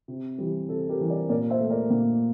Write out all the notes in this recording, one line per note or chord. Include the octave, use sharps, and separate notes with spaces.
C3
E3 G3
C3 A4
G4 A#4
E3 G3
A#4 D5
A#2 A#4 D5
C5 E5
A3
A#4 D5
A#2